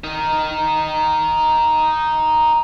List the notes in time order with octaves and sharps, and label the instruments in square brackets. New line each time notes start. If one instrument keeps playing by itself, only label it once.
[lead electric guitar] D#4 A#4